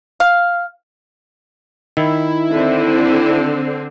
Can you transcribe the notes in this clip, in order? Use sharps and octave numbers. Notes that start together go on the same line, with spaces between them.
F5
D#3 E4
D3 C4